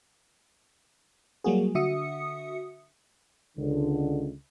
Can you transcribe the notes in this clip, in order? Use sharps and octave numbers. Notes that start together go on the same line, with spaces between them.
F#3 G3 A#3 F#4 G#4
D3 F#4 E5 D#6 C#7
C#2 D3